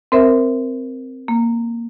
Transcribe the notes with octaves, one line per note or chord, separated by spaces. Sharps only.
C4 A#4 C5 E5
A#3